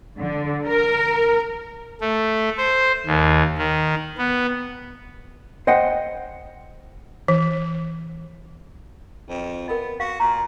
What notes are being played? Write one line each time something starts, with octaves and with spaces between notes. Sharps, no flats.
D3
A#4
A3
C5
D#2
D#3
B3
C5 D#5 F#5 G5
E3
F2
B3 A#4 D#5
F#4 F5
A#2 A#5